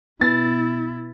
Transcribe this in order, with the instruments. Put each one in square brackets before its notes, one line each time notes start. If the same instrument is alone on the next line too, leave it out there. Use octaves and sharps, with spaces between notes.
[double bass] B2 E4 [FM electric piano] B3 [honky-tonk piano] A6